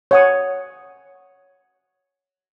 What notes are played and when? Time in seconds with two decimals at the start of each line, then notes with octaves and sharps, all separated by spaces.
0.11 C#5 F#5 D#6